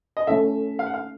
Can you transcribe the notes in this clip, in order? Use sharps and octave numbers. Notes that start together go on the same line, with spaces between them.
D#5
A3 C#4 E4 A4 E5
F5
F#5
F5